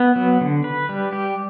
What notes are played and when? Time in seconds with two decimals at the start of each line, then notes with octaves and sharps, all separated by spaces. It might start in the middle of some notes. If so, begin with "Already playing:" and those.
Already playing: B3
0.16 F#3
0.41 D3
0.64 B4
0.89 G3
1.13 G4